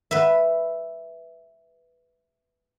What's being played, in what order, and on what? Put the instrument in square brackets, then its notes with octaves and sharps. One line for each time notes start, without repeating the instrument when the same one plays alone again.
[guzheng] B4 E5